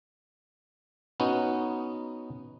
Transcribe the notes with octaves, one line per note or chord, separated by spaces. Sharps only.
B3 C#4 D#4 F#4